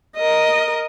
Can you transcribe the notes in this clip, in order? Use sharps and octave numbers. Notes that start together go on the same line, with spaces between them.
A#4 D#5